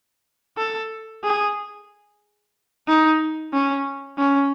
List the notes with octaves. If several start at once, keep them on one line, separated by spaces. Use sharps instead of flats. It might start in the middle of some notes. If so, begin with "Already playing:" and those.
A4
G#4
D#4
C#4
C#4